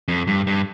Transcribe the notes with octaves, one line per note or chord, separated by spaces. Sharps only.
F2
G2
G2